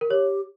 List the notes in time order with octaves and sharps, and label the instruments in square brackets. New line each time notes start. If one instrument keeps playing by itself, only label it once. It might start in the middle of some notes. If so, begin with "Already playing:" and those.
[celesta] A#4
[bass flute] G4 [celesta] C#5